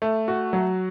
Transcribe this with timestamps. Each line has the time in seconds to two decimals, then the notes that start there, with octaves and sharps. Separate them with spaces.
0.02 A3
0.28 F#4
0.53 F#3